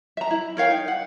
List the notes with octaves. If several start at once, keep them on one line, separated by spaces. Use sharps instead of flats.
E5 A#5
E4
A#4 C#5 F5 G5
D#4
F#5